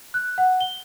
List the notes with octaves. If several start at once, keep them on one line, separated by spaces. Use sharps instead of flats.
F#6
F#5
G7